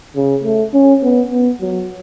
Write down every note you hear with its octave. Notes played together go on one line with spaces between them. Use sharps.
C#3
A3
C#4
B3
B3
F#3